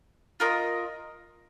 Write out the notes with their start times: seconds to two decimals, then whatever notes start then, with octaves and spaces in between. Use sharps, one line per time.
0.40 F4 A#4 D#5